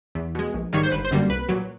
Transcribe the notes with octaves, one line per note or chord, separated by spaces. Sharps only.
E2
B2 G#3
A#1
G#2 D#3 G3 A#3 C#5
C5
G1 B4
C5
F#2 D3 G3 A#3
C2 B4
A#2 F#3